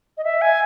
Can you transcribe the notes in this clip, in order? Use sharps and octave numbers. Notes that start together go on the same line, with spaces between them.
D#5
E5
G#5